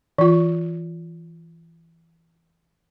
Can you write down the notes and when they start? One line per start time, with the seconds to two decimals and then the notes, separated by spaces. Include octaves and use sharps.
0.18 E3 F4